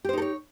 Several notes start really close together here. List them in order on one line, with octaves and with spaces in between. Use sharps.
G4 C5 D#4 A4 C#5